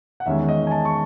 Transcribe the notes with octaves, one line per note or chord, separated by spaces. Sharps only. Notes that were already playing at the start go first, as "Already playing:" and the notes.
F#5
E2 D#3 G#3 C#4 E5
D#5
G#5
A5
C#6